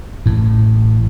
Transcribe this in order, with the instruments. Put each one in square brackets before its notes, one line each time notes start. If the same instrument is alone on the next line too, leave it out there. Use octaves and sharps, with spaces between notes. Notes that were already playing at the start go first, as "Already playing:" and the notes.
[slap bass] A1 A2